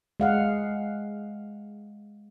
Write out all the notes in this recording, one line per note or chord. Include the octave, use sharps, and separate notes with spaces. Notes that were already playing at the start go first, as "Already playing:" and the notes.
G#3 F5 F#5